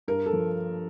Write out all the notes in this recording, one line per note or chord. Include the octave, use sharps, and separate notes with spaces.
G2 A#4
A4
F3